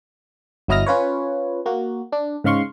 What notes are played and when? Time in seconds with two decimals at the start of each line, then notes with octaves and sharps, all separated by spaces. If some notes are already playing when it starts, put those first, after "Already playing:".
0.68 G1 F#3 E4 D#5 F6 A#6
0.86 C#4 F4 B4 C#5
1.66 A#3 F#4
2.12 D4
2.44 G#2 C#3 G#3 F5 C6 C#6